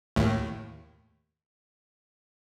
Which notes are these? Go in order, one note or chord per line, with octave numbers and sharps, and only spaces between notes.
D#2 A2